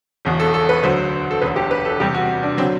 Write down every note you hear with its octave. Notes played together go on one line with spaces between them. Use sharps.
E1 E2 B2
A4
A4
B4
D2 D3 F#3 C5
A4
E1 D2 D3 B4
G4
B4
A4
E2 C3 G3 G4
F#4
D4
D3 F#3 C4